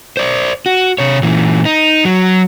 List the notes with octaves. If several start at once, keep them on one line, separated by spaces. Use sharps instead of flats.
C5 D5
F#4
C3 C#5
A#2 E3
D#4
F#3